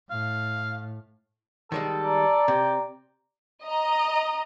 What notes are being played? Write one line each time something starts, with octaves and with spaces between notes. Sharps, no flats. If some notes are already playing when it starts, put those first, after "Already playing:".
A2 F5
D#3 G3 G#3 A4
D5 A#5
C3 G5
D#5 A#5